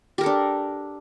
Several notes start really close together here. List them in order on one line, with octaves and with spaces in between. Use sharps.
G4 A#4 A4 D4